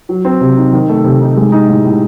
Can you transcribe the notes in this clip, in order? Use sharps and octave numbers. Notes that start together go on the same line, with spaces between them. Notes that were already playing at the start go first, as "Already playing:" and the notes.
F#3
C4
C3
D#4
D#3
A3
C3
D#4
G#3
D#4
A2
A2